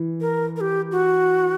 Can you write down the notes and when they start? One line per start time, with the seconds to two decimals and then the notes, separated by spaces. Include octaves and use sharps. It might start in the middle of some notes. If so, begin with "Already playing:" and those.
Already playing: E3
0.21 A#4
0.56 A#4
0.61 G4
0.91 F#4